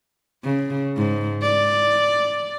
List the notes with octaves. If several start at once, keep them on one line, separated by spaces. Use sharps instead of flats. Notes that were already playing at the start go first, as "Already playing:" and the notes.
C#3
G#2
D5